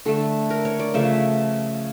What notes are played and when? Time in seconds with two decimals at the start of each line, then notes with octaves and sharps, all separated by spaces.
0.05 D3 A3 A4
0.50 A#4
0.65 C#5
0.79 D5
0.94 C#3 F3 A3 E5